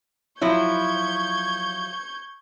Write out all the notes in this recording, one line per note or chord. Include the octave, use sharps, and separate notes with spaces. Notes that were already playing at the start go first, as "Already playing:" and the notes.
F3 F#3 E4 C#6 G6 G#6